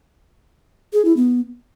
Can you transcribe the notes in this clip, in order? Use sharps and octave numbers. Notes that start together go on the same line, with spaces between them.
G#4
E4
B3